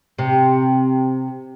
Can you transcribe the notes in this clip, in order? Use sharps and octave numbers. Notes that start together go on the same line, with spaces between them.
C3